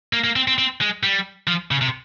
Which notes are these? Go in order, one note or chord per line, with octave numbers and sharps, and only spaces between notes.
A#3
A#3
C4
C4
C4
G#3
G3
F3
C#3
C3